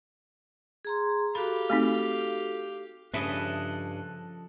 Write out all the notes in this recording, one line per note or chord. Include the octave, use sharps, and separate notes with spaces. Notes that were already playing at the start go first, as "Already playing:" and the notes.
G#4 A#5 C6
F#4 G4 A4 F5 B5
A3 C4 D#4
G2 C#3 F3 A4 B4 D#5 E5 F#6